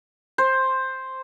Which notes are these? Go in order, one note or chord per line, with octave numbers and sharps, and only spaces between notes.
C5